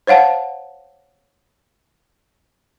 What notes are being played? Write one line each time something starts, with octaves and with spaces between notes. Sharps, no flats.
C5 C#5 F5 F#5 A5